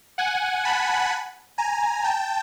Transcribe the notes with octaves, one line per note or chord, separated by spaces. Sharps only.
F#5 G#5
A5 B5
G#5 A#5
G5 A5